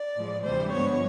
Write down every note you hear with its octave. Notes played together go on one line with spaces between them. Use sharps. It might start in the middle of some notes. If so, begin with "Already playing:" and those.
Already playing: D5
A2 F3 G#3
D2 C3 E3 G3 C5
G2 D3 F3 G#3 B3 C#5